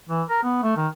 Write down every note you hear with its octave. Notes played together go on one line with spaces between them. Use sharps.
E3
A#4
B3
A3
D#3